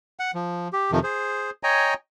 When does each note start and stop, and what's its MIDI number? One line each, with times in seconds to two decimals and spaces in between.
0.20 0.31 78
0.35 0.68 53
0.73 0.91 67
0.92 0.99 41
0.92 0.99 48
0.92 0.99 51
0.92 0.99 53
1.03 1.50 68
1.03 1.50 72
1.63 1.94 73
1.63 1.94 75
1.63 1.94 79
1.63 1.94 80
1.63 1.94 82